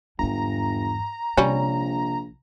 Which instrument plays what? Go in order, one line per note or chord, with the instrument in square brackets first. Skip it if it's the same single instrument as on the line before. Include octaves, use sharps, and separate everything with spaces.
[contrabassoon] G1 [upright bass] E2 G#2 [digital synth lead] A#5
[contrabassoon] A#1 [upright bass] C3 [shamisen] G3 C#4